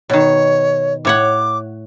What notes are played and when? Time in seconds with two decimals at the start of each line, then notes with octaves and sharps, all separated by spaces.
0.10 B2 D#3 C#5
1.05 A2 C#5 F#5 D6